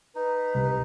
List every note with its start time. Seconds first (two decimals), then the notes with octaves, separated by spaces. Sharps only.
0.15 D#4 B4
0.55 C2